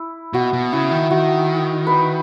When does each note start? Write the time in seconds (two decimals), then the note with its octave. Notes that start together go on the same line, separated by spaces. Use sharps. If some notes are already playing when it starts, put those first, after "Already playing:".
Already playing: E4
0.33 B2 F#4
0.53 B2
0.73 C#3 E4
0.91 D#3
1.10 D#3 F#4
1.87 B4